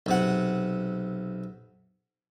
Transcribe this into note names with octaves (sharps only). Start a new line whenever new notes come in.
B1 C3 F#5